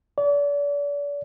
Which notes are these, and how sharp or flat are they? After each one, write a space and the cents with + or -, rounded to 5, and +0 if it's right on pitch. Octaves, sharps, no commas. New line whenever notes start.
D5 -40